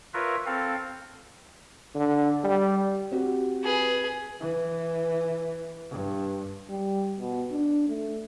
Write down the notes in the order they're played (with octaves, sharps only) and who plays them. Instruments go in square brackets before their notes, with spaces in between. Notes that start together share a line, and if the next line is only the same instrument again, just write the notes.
[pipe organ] F4 A#4 B4 C#5 E5
C4 A4 F5
[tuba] D3
G3
[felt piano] C4 F#4 G4
[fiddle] G#4 B4
[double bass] E3
G2
[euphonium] G3
B2
D4
A3